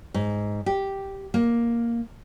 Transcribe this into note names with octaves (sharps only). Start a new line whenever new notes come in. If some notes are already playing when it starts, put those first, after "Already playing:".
G#2
G4
A#3